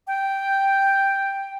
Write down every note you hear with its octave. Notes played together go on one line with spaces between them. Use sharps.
G5